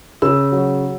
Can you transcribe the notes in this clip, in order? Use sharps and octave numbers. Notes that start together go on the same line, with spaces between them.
C#3 E6
F#3